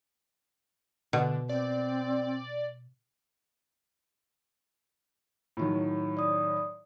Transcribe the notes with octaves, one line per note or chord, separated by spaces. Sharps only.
B2 D3
C4 D5
A2 D#3 F#3
D5 D#6